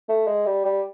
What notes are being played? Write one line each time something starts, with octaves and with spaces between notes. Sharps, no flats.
A3
G#3
G3
G3